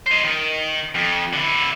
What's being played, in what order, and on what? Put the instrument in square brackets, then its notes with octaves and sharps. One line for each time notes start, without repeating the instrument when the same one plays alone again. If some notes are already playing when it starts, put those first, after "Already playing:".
[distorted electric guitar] C5 D#5
D#3
F2
D3 E4